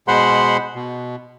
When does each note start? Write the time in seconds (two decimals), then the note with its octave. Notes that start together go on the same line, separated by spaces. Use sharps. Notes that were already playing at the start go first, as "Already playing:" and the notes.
0.08 B2 G#3 C5 F#5 B5 C6
0.75 B2